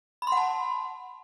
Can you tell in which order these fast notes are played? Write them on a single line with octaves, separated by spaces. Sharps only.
B5 C6 F#5 A5